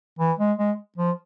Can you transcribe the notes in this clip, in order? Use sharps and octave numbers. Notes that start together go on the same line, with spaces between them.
E3
G#3
G#3
F3